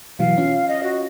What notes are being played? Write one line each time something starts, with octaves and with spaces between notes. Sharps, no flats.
B2 E3 F#3 F5
C#4 F4
D#5
F#4